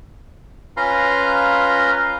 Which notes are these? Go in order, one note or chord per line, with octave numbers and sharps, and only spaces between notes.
C#4 F4 B4 F5 A#5 C6